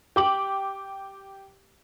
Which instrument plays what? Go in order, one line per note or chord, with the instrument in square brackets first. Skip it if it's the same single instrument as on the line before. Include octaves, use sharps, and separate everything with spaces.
[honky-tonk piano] G4 D6 F#7